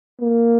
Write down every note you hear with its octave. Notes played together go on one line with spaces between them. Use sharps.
A#3